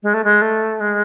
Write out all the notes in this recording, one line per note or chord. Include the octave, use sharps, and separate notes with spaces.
G#3
A3
G#3
A3
G#3